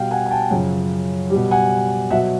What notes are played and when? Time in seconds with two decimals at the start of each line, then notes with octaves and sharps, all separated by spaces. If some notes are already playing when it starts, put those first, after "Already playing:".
Already playing: B2 G3 F5 G5
0.11 F#5 G#5
0.26 G#5
0.31 G5 A5
0.51 F#2 C#3 F3
1.30 B2 G3
1.51 F#5 G#5
2.11 B2 F#3 E5 F#5